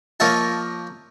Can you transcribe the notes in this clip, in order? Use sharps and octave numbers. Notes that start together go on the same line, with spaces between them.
F3 A#3 C#5 D#5 E5 A5